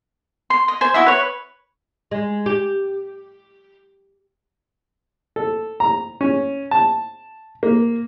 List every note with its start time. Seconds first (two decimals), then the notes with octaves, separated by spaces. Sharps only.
0.50 C6
0.68 D#5
0.81 C5 G#5
0.94 E4 F#4 D#5 E5
1.06 B4 C#5
2.11 G#3
2.46 G4
5.36 A4
5.80 A#5
6.21 C#4
6.71 A5
7.63 A#3